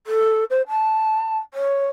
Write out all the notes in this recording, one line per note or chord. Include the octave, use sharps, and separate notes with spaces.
A4
C5
A5
C#5